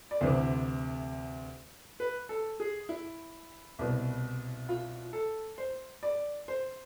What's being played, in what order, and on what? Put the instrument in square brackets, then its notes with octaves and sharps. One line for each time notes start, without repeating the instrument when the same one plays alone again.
[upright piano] D5
D2 C3 E3 C5
B4
A4
G#4
E4
C2 B2
F4
A4
C5
D5
C5